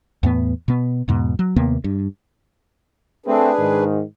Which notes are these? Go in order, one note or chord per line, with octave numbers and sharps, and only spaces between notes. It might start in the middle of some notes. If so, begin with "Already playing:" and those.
E2 A2 B3
B2 B3
E2 G#2 B2
F#3
D#2 C3 A#3 B3
G2
A3 C4 D4 G#4 B4
G#2 D#3